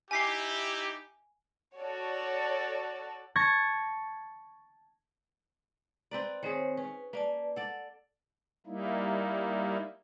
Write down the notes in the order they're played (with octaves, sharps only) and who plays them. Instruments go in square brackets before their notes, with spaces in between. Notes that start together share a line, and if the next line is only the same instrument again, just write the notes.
[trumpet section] D#4 E4 G4 [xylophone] G#5 B6 C7
[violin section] F#4 A4 C#5 D5
[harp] A5 C#6 G#6 A#6
[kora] C4 B4 D5 [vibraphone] A#5
[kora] D#3 G#4 [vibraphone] C4 C5 C#5
[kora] C#4 [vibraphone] B4
[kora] A#3 [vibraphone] B4 D5 A5
[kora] A4 D5 [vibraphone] F#5
[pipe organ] G3 A#3 D#4 E4